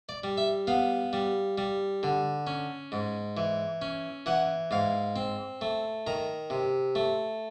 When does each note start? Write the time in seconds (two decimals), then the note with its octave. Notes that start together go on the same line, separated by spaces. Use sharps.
0.09 D5
0.24 G3
0.37 E5
0.67 B3 F5
1.13 G3
1.58 G3
2.03 D3
2.47 C#4
2.92 G#2
3.37 E3
3.82 C#4
4.26 E3 F#5
4.71 G#2 F5
5.16 C4
5.61 A3
6.07 D#3 A#5
6.50 C3
6.95 A3